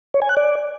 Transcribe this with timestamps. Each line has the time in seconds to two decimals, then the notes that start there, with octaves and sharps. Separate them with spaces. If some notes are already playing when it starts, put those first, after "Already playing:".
0.14 C#5
0.22 G#5
0.29 F#6
0.37 D5